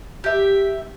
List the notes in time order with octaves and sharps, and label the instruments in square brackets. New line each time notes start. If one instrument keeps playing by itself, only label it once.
[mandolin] G4 E5